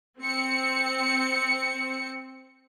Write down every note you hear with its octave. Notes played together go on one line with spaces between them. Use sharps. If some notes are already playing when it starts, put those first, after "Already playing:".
C4 C#7